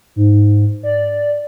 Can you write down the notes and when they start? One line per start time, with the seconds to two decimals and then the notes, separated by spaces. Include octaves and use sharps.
0.16 G#2
0.83 D5